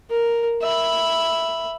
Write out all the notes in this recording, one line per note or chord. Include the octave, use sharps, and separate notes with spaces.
A#4
E5 B5